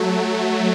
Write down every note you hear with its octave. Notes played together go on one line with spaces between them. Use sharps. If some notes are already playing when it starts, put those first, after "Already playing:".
Already playing: F#3 A3